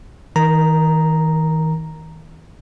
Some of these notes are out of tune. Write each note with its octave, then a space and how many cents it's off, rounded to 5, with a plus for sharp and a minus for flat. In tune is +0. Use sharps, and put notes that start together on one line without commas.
D#3 +45 A#4 +0 A#5 +0